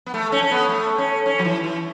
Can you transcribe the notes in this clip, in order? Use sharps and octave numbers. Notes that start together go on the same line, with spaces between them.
B3
A3
C#4
C#4
B3
A3
C#4
C#4
F#3
E3
E3